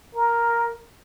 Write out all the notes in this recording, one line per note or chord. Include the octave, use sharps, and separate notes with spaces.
A#4